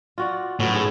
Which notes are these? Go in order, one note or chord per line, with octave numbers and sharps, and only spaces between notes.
F4 F#4 D5
A2 F#3 B3 C#4
G#2 G#4